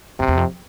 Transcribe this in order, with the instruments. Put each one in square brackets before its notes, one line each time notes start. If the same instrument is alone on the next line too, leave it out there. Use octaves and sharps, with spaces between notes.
[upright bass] F2 [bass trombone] C3
[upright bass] E2
F2